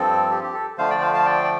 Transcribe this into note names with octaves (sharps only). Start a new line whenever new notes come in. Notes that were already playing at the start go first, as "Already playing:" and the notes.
Already playing: G2 F3 C4 A4
G4
G4
A4
D3 F3 A3 C5 F5
D5 G5
C5 F5
F5 A5
D5 G5
D5